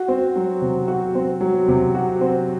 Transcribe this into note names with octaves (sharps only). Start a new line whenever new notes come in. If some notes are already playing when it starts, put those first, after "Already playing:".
Already playing: F#4
C4
F#3
C3
F#4
C4
F#3
C3
F#4
C4